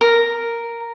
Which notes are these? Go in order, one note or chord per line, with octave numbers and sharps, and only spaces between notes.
A#4